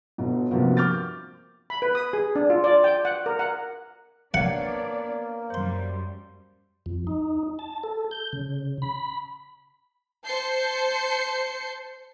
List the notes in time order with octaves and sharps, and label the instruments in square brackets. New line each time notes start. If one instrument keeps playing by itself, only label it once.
[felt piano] G1 B2
G2 C3 F3 A#3 B3 F#4
D6 F6 G6 A6
[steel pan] B5
B4
D#6
G#4
D4
F4
D5
G5
F#5
A#4
F#5
[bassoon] A#3 [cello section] B3 D4 D5 [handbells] C#5 F5 [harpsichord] F#5
[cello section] F#2 G3 [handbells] C5 C6
[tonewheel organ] F2
D#4
A5
A4
G6
C#3
B5
[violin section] C5 A5 G6 C7 C#7